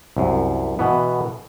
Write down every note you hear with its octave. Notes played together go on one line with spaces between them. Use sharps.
C2 F#2
B2 E3 B3